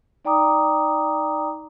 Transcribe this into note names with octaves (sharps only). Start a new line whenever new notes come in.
D#4 D5 G5 A#5 D6 D#6